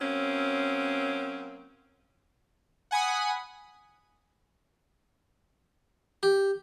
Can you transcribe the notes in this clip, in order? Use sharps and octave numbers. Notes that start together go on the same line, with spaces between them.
F#3 A#3 C4 C#4
F#5 G#5 B5 D#6
G4